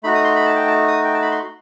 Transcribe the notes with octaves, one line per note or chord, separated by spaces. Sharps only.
A3 D#4 F#4 B5
D#6
C6
B5
A5
G5
A5
D#6
G5
A5
B5
C6